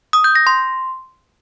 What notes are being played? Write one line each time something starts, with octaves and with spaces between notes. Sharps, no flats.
D#6
G6
A#6
C6